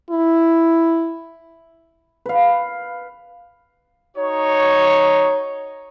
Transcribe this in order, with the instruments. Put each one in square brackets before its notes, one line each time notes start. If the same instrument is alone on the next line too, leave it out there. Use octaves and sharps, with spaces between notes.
[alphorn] E4
[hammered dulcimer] B4 F5
[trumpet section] D#4 F#4 C#5